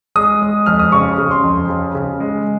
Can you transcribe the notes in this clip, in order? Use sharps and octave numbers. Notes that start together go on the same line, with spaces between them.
G#3 D#6
G#3
F2 F6
D#6
C#3 C#6
C#3
C6
F2
C#3
C#3
G#3